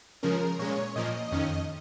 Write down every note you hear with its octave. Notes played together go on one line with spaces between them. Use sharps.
C#3 F3 G#3 C#4 A#4
A#2 G#3 C#4 C#5
A#2 F3 A#3 D#5
F2 D#3 C#4